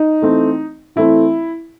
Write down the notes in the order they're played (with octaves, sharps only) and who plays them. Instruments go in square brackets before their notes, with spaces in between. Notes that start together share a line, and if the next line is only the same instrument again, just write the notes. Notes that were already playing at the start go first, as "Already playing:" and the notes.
Already playing: [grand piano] D#4
E3 A3 C4
E3 A3 C4 E4